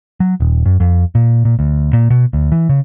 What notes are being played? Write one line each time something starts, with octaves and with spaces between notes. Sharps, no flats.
F#3
D#1
F#2
F2
A#2
A#2
D2
A#2
B2
D2
E3
C#3